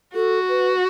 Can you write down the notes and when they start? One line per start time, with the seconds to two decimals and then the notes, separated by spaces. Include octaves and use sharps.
0.15 F#4 A4
0.49 B4